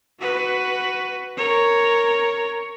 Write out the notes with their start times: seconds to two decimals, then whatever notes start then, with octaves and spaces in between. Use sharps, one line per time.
0.20 F#4 B4
1.37 A#4 C#5